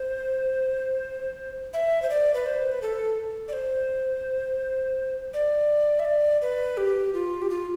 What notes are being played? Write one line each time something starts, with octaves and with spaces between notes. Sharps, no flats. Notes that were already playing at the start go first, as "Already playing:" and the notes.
Already playing: C5
E5
C5
D5
B4
C5
B4
A4
D5
C5
D5
E5
D5
B4
G4
F4
G4
F4